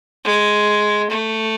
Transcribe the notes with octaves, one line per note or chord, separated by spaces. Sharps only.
G#3
A3